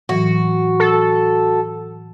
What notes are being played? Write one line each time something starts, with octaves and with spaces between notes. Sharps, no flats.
A2 E3 F#3 F#4
A4